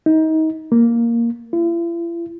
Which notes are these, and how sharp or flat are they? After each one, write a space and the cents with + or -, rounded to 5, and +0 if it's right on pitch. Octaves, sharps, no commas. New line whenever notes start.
D#4 +30
A#3 +0
E4 +45